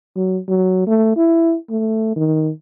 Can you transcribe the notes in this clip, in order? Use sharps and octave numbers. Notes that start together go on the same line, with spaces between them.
F#3
F#3
A3
E4
A3
D#3